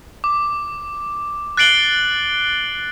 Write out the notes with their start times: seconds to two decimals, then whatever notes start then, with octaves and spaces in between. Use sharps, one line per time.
0.24 D6
1.57 F#6 A6 C7 D7 F#7 G7